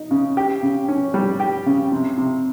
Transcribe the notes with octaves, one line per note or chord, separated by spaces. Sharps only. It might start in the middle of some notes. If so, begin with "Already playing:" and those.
Already playing: D#4
C#3
G4
C#3
C#4
G3
G4
C#3
C3
C3